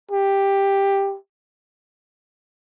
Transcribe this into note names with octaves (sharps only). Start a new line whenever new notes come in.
G4